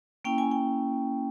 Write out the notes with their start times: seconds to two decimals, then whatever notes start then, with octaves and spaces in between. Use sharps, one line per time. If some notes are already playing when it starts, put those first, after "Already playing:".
0.25 A#3 C#4 E4 G5
0.38 G#5
0.51 G5